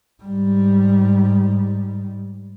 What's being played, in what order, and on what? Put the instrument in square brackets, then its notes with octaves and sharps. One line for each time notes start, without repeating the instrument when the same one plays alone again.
[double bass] G#2 G3